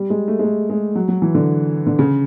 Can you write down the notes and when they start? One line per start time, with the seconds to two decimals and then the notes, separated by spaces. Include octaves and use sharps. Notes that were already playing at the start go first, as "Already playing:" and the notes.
Already playing: G3
0.10 G#3
0.28 A3
0.39 G#3
0.44 A3
0.70 G#3
0.95 F#3
1.08 F#3
1.22 E3
1.35 D3
1.87 D3
1.99 C#3